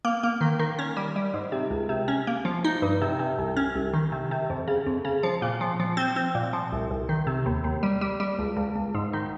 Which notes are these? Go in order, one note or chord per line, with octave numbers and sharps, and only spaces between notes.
A#3
A#3
D#3
D#3
C#4
G3
G3
G#2
C3
C#2
C3
C#4
A#3
F3
D#4
G2
C3
C3
C2
C#4
C2
D#3
C3
C3
F2
C#3
F2
C#3
F3
A#2
F3
F3
C4
C4
A#2
F3
C2
C2
D#3
C3
D#2
D#2
G3
G3
G3
C#2
C#2
C#2
G#2
D#3